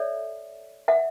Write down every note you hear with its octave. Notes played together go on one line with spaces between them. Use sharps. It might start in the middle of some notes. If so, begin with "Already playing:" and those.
Already playing: A4 C#5 D5 E5
E5 F#5